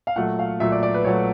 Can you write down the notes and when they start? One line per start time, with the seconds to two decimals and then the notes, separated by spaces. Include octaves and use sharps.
0.07 F5
0.16 A#2 F#3 A3 F#5
0.39 F5
0.60 A#2 F#3 A3 E5
0.72 D5
0.83 D5
0.94 B4
1.04 A#2 F#3 A3 C#5